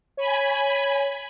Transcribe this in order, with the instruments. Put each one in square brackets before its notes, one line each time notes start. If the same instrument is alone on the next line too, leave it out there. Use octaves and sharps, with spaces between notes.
[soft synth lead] C#5 [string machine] G#5 B5